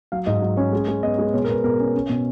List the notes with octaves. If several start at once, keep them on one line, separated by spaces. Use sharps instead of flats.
F#3 F5
G#2 D#5
F#3
C#4 C#5
G#3
G#3
B3 D#5
G#3
B2 C#5
A#4
B2 B4
B2 A#4
C#4
C#4
B2